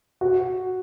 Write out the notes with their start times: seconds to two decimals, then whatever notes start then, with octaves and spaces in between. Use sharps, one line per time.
0.21 F#4